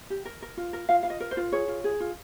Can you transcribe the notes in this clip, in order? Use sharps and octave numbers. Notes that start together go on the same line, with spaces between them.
G4
A#4
A#4
F4
A#4
F4 F5
F4 F5
D#5
A#4
C5
F4
G#4 C#5
F4
G#4
F4